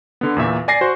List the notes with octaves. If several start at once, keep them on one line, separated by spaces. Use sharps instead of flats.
D3 B3
E2 A#2 E5
D5 G#5 A#6 C7
F#4 C5